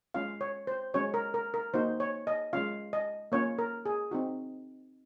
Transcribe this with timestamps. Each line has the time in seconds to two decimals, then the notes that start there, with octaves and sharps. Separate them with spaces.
0.14 G#3 C#4 F4 F5
0.41 C#5
0.67 C5
0.94 G#3 C#4 F#4 C#5
1.14 A#4
1.34 A#4
1.54 A#4
1.74 A#3 D#4 F#4 C5
2.00 C#5
2.27 D#5
2.53 G#3 C#4 F4 F5
2.93 D#5
3.32 A#3 C#4 F4 C#5
3.59 A#4
3.86 G#4
4.11 C4 D#4 F#4